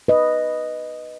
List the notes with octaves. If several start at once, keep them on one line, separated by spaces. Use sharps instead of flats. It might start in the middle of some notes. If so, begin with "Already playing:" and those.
B4 D#5